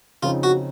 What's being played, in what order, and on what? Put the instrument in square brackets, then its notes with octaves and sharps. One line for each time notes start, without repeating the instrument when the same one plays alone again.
[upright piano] C#3 F3 C4 D#4 [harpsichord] F4
[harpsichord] F#4